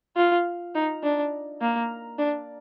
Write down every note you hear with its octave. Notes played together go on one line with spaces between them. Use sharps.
F4
D#4
D4
A#3
D4